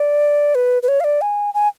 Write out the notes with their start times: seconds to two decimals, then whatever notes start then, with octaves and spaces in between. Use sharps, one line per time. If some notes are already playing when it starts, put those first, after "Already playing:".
Already playing: D5
0.55 B4
0.83 B4
0.88 C#5
1.00 F5
1.04 D5
1.21 G#5
1.54 G#5